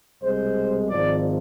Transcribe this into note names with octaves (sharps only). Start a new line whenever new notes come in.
C2 B2 G#3 C5
G#1 G#2 F3 D5